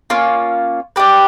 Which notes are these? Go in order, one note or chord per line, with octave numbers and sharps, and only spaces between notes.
A#3 C#4 F4
D4 G4 B4